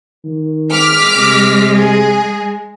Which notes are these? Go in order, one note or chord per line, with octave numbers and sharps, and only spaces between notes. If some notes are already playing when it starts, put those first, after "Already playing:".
D#3
G#3 D6 F6 B6
C3
G#4